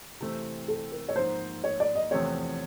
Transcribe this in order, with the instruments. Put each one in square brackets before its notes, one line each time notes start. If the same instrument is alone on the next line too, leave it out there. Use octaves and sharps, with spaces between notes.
[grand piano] C3 E3 A3 C4
[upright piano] A4
A#4
C#5
[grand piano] G#2 F3 A#3 [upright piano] C5
[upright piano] C#5
D5
D#5
[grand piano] E2 C3 F3 A3 C4 [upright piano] C#5